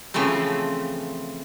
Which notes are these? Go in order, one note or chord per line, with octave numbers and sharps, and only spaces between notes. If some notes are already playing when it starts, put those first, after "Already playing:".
C#3 E3 F3 A3 C4